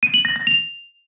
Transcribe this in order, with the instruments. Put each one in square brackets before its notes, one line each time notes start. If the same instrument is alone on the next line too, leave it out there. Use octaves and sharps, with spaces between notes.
[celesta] D#7
F#7
A#6
A#6
F7